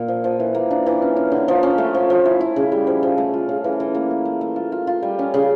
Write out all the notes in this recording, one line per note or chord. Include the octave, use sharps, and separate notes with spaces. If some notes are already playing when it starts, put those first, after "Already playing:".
Already playing: A#2 A#3
F3
F3
E3
A#3
D4
E3
C#4
C#4
D3
F3
C#4
A3
F3
F3
E4
E4
C#3
G3
F3
F3
A3
F4
C#3
E3
E3
A#3
A3
A3
A3
F4
F4
F4
G3
C#4
C#3